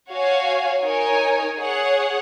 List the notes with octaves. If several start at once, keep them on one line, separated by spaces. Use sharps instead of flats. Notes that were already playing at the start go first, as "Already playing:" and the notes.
F#4 C#5 F5 G#5
D#4 A#4 C#5 G#5
G#4 C#5 F#5